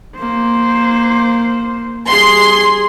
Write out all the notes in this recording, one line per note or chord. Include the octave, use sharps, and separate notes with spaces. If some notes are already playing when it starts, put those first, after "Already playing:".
A#3 C5
G3 G#4 C6